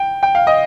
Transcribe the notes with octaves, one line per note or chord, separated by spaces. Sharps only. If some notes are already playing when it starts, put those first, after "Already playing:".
Already playing: G5
G5
F5
D#5